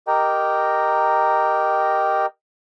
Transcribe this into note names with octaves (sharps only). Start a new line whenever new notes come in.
G4 A#4 D#5 G5 A#5